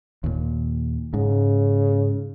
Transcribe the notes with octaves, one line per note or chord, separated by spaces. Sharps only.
D#2 A#2
G#2 C#3